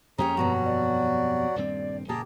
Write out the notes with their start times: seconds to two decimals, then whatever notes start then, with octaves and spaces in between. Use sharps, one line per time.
0.18 F2 A#3 C#4 G4 G#4 C#5 A#5
0.37 G2 B2 F#3 G3 F#4
0.65 D5
1.56 D#1 G2 C4
2.09 F#1 A#2 A#3 G4 G#4 A5 A#5